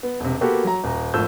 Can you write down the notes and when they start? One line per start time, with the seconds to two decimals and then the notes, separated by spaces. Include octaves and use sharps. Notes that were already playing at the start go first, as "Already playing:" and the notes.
0.03 B3
0.20 E1 C3
0.41 A#3 B3 F#4 G4 A4 B4
0.64 F#3 A#5
0.84 D#1 A#5
1.14 G#1 F3 A3 E6 G6